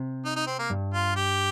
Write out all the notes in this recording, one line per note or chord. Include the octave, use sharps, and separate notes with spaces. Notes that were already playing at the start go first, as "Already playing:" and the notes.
Already playing: C3
D#4
D#4
C4
A#3
G2
F4
G4